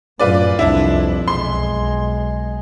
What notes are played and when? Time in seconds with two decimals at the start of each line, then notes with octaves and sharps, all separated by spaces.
0.19 F#2 A2 F4 B4 D5
0.59 C2 F2 D4 E4
1.28 B1 G#3 C6